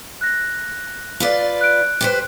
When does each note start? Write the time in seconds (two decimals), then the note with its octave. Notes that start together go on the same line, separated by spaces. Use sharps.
0.21 F#6 A#6
1.20 F4 B4 D5
1.61 F#6 D7
2.01 G4 B4 C5